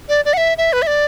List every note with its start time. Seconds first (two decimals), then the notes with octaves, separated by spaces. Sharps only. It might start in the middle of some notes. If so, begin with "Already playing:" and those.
0.09 D5
0.25 D5
0.33 F#5
0.37 E5
0.58 E5
0.73 B4
0.82 E5
0.87 D5